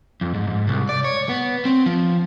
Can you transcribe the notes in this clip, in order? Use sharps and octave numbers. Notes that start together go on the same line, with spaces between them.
F2
G#2
G#2
C2
D5
C#5
B3
C4
F3